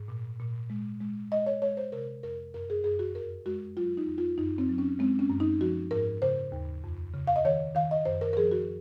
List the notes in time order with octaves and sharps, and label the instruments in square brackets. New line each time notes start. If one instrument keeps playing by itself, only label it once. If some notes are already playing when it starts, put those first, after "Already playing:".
Already playing: [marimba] G#2
A#2
A#2
G#3
G#3
G#3 D#5
C#5
G#3 C#5
C5
C3 A#4
F2 A#4
F#2 A#4
G#4
F#2 G#4
F#4
F2 A#4
G#3 F#4
F#3 F4
D#4
F2
F4
F#2 D#4
C4
F#3
C#4
G#3 C4
C#4
F#2
D#4
F3 F#4
G#2 A#4
C#3 C5
D#2
F2
C#3
F5
D#5
D#3 C#5
D#3 F5
D#5
F#2 C5
A#4
A#4
F3 G#4
F#4